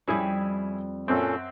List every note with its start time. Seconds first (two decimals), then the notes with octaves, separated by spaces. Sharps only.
0.08 F2 G3 C#4 E4 G#4
1.08 F#2 A#2 C4 C#4 A4